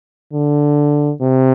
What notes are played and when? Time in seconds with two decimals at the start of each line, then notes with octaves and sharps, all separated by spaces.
0.33 D3
1.21 C3